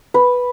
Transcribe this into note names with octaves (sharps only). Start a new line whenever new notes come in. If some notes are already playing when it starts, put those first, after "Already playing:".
B4